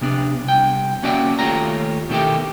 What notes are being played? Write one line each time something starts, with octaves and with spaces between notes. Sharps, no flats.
C3 B3 D4
C2 G5
A#3 C#4 F#4 D5 E5 G5
D#2 A3 F4 G4 C#5 A#5
B2 D#3 A3 D4 E4 G4